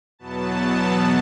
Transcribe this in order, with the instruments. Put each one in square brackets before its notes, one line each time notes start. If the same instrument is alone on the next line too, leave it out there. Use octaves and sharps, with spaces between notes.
[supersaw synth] E2 B2 F#3 B3 A5